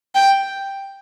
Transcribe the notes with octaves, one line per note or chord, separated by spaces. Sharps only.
G5